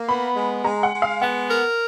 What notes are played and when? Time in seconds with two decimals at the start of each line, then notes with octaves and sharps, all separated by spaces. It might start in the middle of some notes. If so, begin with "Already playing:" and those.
Already playing: A#3
0.09 B3 B5
0.36 G#3
0.64 G#3 A#5
0.83 F#5
0.92 G#3
1.02 F5
1.21 B3 F#5
1.49 A#4